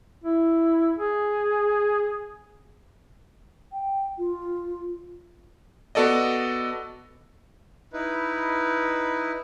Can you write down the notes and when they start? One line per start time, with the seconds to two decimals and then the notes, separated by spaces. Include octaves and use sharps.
0.24 E4
0.97 G#4
3.72 G5
4.17 F4
5.95 B3 F#4 A4 D5 D#5
7.93 D#4 E4 B4